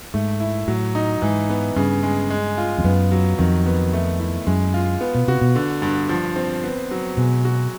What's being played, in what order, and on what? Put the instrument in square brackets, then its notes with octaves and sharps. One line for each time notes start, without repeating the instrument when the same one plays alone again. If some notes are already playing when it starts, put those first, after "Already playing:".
[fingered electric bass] G#2 [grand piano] A3
[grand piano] E4
[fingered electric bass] A2 [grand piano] F#3
[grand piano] D#4
[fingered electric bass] G#2 [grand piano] E3
[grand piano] B3
[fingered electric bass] G2 [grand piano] C#3
[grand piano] G#3
G#3
F4
[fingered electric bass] F2
[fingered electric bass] F#2 [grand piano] B3
[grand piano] F#3
[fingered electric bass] F2 [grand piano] D#3
[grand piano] B3
A3
E4
[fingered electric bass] F#2 [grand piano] G#3
[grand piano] F4
B3
[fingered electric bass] B2
[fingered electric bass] C3 [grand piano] F#4
[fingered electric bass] B2
[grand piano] D3
G2
F3
C4
B3
F#3
[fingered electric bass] B2 [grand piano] G#3
[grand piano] F#4